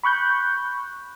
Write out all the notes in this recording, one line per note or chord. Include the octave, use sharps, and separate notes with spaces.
B5 C#6 F#6 G6